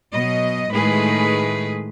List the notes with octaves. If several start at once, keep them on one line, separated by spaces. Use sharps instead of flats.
B2 F#3 D#5
A2 D#3 G#3 A3 G#4 B4